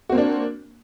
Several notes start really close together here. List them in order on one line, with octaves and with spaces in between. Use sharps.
F#4 C4 A#3 D4